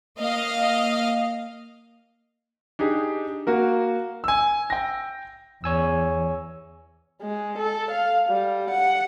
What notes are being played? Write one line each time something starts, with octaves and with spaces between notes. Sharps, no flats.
A#3 D#5 F5
D4 D#4 G4 G#4
A#3 F#4 A#4
G#5 E6
G5 A#6
E2 C#5 G#5 E6
G#3
A4
F5
G3
F#5